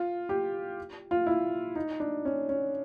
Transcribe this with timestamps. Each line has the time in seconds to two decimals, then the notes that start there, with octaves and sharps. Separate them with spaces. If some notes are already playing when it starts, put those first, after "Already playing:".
Already playing: F4
0.29 G4
1.11 F4
1.27 E4
1.76 D#4
2.00 D4
2.25 C#4
2.49 C#4